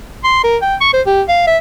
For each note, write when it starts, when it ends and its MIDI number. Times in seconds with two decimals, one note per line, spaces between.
0.24 0.41 84
0.44 0.57 70
0.62 0.76 79
0.81 0.90 85
0.93 1.02 72
1.07 1.22 67
1.28 1.45 77
1.47 1.58 76